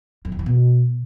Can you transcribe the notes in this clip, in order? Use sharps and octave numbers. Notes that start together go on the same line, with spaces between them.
F2
E2
E3
B2